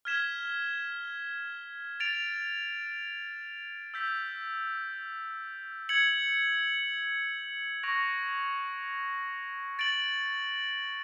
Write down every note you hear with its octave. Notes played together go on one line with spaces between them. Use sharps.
F6 G#6 B6 E7 G7
A6 D7 F7
E6 G6 B6
G#6 C#7 F#7
C#6 F#6 A#6 D7 F7
A6 D7 F#7